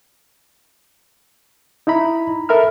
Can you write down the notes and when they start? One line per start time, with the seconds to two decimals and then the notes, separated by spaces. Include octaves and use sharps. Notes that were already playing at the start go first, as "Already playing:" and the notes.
1.87 D#4 E4 A#5 B5
2.49 A4 A#4 E5 B5 F6